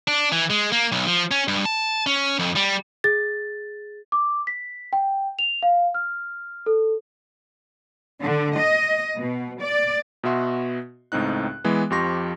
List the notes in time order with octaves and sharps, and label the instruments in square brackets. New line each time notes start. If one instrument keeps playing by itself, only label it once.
[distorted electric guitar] D4
E3
G#3
A#3
B1
F3
C#4
G2
A5
C#4
F2
G3
[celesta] G#4 A6
D6
B6
G5
F7
F5
F6
A4
[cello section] D3
D#5
B2
D5
[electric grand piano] B2 B3 F#4 E5 C6
C#2 A2 C4 D#4 F#6
E3 G#3 B3
F2 F3 G4 C6 C#6 A#6